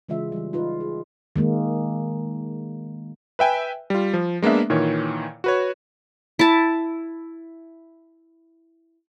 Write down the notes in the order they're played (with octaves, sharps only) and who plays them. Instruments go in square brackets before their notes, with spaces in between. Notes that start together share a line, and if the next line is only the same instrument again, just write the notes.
[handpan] C#3 E3 G#3 F4 E5
E3 G3
D#4 F4 B4
G#4
D#3 G#3 A#3
[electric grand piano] B4 E5 G5 G#5
G3 F4
F3
G#3 A#3 B3 D4 E5
A#2 D#3 E3 C#5
F#4 B4 C#5
[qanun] E4 A5